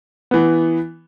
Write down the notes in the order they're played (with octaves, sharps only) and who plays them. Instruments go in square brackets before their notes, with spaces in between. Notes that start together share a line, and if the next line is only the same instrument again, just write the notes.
[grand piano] E3 B3